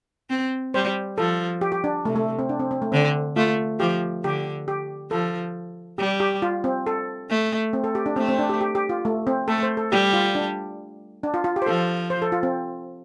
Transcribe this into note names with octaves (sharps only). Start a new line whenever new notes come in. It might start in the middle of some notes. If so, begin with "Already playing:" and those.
C4
G3 C5
F3 A4
G4
G4
D4
C3 A3
A3
C4
D4
C4
C4
A3
D3 C4
A3 F4
F3 G4
D3 G4
G4
F3 A4
G3 G4
G4
F4
C4
A4
A3
C4
A4
G4
D4
A3 C4
C4
D4
G4
G4
G4
F4
A3
C4
A3 A4
C5
A4
G3 G4
F4
D4
D4
F4
F4
G4
C5
F3 A4
C5
A4
F4
C4